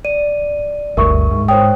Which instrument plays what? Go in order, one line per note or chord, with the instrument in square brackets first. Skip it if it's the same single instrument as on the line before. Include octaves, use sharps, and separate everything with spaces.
[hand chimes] D5 [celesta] D#7
[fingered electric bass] G1 D2 G2 [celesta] A#4 E5 C#6
[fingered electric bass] G#2
[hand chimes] C5 C#5 G5 [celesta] D#6